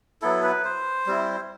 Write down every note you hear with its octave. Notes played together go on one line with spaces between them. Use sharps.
F#3 B3 E4 A4
B4
C5
G3 C4 E4